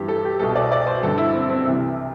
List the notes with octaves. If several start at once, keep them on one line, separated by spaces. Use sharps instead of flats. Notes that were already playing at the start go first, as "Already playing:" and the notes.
Already playing: G2 E3 G4
A4
G4
C2 B2 A4
D5
D5
C5
G2 D3 A4
E4
C4
C4
C2 C3 E3